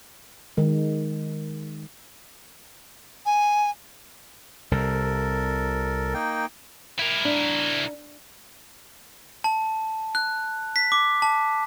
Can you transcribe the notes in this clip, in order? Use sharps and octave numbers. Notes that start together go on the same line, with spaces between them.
D#3 G#3
G#5
C2 C3 A4 A#4
A#3 D#4 G5
E4 A#4
D4
A5
F#6
B6
D6
A5